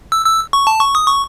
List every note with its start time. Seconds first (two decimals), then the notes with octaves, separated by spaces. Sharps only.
0.12 E6
0.26 E6
0.53 C#6
0.67 A5
0.81 C#6
0.95 D#6
1.07 C#6